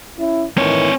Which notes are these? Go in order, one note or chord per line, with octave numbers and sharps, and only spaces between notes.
C#4 E4
A2 D#3 E3 C4 C#5